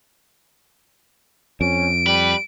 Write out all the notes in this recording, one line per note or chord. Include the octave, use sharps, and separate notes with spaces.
F2 C#4 D7
G3 B4